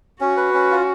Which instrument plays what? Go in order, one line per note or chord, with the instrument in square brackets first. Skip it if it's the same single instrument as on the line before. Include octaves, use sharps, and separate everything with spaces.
[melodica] C#4 [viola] F#4
[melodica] B4
C#4
F4